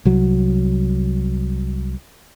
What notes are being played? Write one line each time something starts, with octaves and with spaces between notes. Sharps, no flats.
C2 F#3